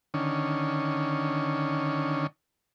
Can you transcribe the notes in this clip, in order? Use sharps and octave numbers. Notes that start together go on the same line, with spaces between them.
D3 D#3 C#4